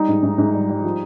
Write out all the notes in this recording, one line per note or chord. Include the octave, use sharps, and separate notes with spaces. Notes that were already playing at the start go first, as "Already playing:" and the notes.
Already playing: G3 D#4
G#2
G#2
G#2
G3
G3
F3